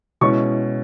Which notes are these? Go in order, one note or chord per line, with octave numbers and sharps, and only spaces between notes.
B2 G#3 C#4 E4 C#6